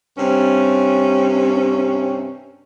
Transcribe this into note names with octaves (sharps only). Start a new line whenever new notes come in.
G2 C3 C#4